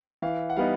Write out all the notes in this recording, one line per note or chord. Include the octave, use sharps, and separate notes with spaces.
E3 F5
F#5
G3 B3 D#4 F5